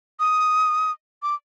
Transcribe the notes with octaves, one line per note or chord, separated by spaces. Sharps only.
D#6
D6